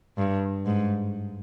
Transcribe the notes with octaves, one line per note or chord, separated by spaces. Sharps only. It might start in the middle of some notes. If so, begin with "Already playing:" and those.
G2
G#2